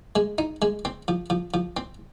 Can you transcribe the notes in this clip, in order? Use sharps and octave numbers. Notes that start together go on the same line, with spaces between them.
G#3
D#4
G#3
C4
F3
F3
F3
C4